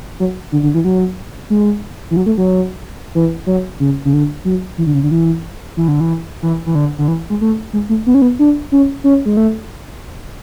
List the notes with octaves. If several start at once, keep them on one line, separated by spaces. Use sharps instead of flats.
F#3
D3
D3
E3
F#3
G#3
E3
F#3
A3
F#3
E3
F#3
C#3
C#3
D3
F#3
E3
D3
C#3
D3
E3
E3
D3
E3
E3
E3
D3
D3
E3
G#3
A3
G#3
A3
B3
C#4
B3
D4
C#4
C#4
G#3
A3